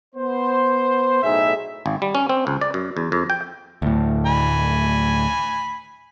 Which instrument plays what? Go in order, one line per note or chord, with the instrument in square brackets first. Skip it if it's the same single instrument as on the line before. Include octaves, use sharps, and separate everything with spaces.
[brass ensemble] B3 C5
B1 A2 D#4 G#4 E5
[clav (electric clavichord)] G#1
G3
C#4
C4
C#2
D5
F#2
E2
F2
G5
[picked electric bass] D2 A2
[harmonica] G#5 B5